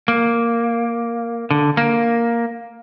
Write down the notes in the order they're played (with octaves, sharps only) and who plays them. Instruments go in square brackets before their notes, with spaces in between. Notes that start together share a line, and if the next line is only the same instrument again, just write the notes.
[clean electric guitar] A#3
D3
A#3